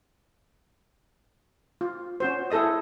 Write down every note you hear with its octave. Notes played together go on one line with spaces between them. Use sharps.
F4
C#4 F#4 C5
E4 G#4 A4 D#5 D#6